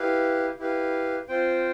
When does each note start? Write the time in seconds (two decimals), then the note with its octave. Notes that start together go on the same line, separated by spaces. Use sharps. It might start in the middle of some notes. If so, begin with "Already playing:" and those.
Already playing: E4 G4 B4 F5
0.59 E4 G4 B4 F5
1.28 C4 F4 C5 G5